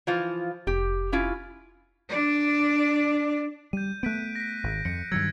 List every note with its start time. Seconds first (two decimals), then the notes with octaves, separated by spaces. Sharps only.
0.07 E3 F3 F4
0.67 F1 G4
1.12 C#4 E4 F4
2.09 D4 D5
3.73 G3 G6 D#7
4.03 A3 B3 F#6 B6 D7
4.36 A#6 B6
4.63 G#1
4.85 F2 C#7
5.12 G2 D#3 F#3 E6 G#6 C#7